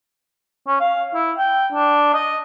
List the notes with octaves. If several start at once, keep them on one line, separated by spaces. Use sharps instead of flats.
C#4
F5
E4
G5
D4
D#5